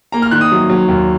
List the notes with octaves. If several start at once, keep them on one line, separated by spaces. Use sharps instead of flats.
A#3 A#5
F6
D#3 F#6
D#6
F#3
F#3
D#2